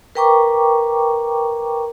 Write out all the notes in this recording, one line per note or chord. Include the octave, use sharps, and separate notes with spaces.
A#4 B4 G5 A#5 C#6 D6